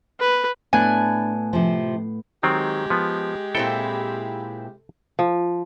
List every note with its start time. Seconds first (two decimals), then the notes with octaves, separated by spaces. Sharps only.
0.20 B4
0.73 A2 B3 D4 G#5 F#6
1.53 C3 F3
2.43 D#3 F#3 G#3 C4 G4
2.90 F3 B3
3.55 A#2 C4 E4 A4 G5
5.19 F3